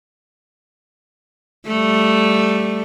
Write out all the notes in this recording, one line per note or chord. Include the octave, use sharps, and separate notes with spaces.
G3 A3